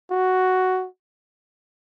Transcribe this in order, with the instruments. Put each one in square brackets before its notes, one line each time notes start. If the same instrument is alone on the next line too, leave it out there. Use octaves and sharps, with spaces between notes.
[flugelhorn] F#4